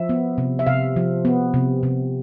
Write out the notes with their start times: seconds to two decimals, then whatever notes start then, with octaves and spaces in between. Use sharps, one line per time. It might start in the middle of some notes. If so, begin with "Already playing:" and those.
Already playing: F3 E5
0.09 B3
0.38 C3
0.59 E5
0.67 C3 F5
0.96 F3
1.25 B3
1.54 C3
1.83 C3